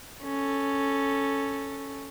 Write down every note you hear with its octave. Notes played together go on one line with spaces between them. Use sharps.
C#4 A4